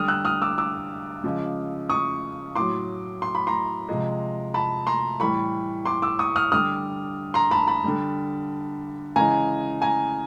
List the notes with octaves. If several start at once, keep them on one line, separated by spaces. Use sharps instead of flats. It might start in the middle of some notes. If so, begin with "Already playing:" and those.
Already playing: D3 G3 D#6 F6
E6 F#6
D#6 F6
D6 E6
D6 E6
C#3 F3 G#3
C#6 D#6
A2 F#3 C6 D6
C6
B5
A#5 C6
C3 F3 G#3
A5 B5
A#5 C6
A2 E3 G3 B5 C#6
C6 D6
D6 E6
C#6 D#6
D#6 F6
D3 G3 D#6 F6
A#5 C6
A5 B5
A5 B5
D3 G3
C#3 E3 G#3 G#5 A#5
G#5 A#5